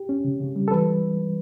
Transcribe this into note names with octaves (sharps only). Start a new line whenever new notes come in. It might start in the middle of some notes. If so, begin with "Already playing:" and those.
Already playing: G4
C#4
C#3
C#3
G3
A4
E3 B4